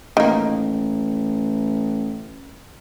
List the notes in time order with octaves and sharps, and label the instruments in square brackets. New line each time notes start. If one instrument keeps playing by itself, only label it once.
[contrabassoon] A1 [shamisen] D#3 A#3